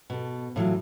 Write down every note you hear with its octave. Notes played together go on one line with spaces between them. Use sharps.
B2 A4
A2 E3 F#3 F4